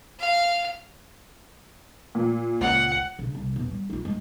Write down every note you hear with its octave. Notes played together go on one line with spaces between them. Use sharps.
F5
A#2
C#2 F#5
C#3 D4
C2
A1 E2
G3
E4 F4
G2 G#3